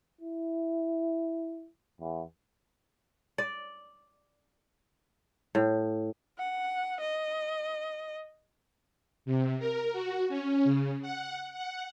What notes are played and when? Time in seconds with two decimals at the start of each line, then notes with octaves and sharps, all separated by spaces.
0.21 E4
2.01 E2
3.38 D5
5.55 A2
6.39 F#5
7.01 D#5
9.25 C3
9.59 A#4
9.93 F#4
10.29 C#4
10.65 C#3
11.02 F#5
11.53 F#5